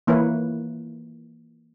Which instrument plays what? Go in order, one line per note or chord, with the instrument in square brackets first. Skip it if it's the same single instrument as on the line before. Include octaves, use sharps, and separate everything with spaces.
[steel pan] E3 A#3 E4 B4 C#5